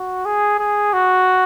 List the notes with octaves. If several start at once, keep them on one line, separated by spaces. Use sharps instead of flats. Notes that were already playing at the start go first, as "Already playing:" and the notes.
Already playing: F#4
G#4
G#4
F#4